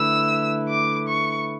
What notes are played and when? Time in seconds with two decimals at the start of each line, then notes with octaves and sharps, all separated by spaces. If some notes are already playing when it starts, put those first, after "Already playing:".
Already playing: D3 A3 E4 B4 E6
0.69 D6
1.08 C#6